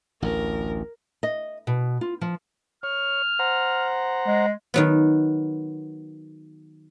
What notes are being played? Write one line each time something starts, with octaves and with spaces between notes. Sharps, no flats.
A1 D2 A#4
D#5
B2
F4
F3
C#5 F6
C5 F#5 A#5
G#3
D#3 F#3 B3